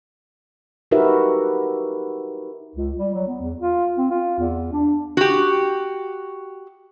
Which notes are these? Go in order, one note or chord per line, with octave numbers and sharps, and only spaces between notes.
D#4 F#4 G4 A#4 B4 E5
C#2
G3
F#3
B3
E2
F4
C4
F4
E2
D4
F#4 G4